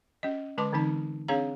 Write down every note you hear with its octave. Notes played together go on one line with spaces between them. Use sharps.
C#4 D#5
D3 G#3 B4 A5 C6 D6
D3 E3 C4 D#4 A5
C4 D4 G#4 C#5 F5 A#5